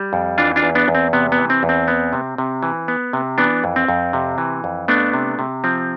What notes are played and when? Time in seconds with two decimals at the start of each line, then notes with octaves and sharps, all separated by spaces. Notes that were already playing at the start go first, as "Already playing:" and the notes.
Already playing: G3
0.13 F2
0.38 E3 D4 F4
0.56 D4 F4
0.63 E2
0.75 B3 D4
0.88 E2
0.95 C4
1.13 C3 B3
1.32 B3
1.38 E3
1.50 C4
1.63 E2
1.69 C4
1.88 B3
2.13 C3
2.38 C3
2.63 E3
2.88 B3
3.13 C3
3.38 E3 B3 D4
3.64 F2
3.76 C4
3.88 F2
4.13 C3
4.38 E3
4.64 F2
4.88 A3 B3 D4
5.13 C3
5.39 C3
5.64 F3 C4